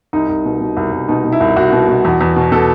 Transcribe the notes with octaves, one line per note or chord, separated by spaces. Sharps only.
C2 D#4
C2
B2
B2
C2
C2
B2 D#4
B2
E4
C2
C2 F#4
B2
B2
E2
E2
B2
B2 A4